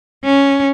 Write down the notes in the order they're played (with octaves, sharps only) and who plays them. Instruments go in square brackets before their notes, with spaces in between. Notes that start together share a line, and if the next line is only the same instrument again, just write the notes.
[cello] C#4